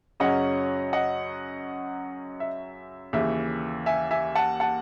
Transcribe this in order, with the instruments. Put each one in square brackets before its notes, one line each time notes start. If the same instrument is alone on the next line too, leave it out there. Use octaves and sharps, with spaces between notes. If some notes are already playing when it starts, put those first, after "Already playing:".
[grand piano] F#2 C#3 F#3 C#4 D#5 F#5
D#5 F#5
E5
D#2 C#3 E3 E5
E5 G#5
E5 G#5
F#5 A5
F#5 A5